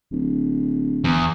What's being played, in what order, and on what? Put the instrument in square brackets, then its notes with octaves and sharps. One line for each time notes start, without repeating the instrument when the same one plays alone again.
[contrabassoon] D1
[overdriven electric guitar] E2